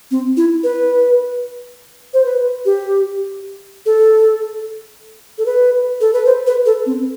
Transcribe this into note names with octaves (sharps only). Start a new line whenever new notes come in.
C4
E4
B4
C5
B4
G4
A4
A4
B4
A4
B4
C5
B4
A4
C4